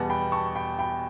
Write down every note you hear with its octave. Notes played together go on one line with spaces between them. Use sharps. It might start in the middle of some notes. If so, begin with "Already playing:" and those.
Already playing: E2 B2 G3 B3 F#5 A5
G5 B5
A5 C#6
G5 B5
G5 B5